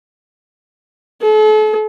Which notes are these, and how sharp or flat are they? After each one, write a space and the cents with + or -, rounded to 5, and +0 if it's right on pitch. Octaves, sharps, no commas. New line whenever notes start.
A4 -40